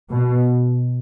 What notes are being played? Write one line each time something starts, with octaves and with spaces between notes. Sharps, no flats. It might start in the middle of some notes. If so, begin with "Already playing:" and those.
B2